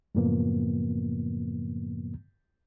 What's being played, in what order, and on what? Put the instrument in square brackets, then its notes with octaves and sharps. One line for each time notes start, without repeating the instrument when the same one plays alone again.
[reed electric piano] F#2 A2 C#3 F3 A#3 B3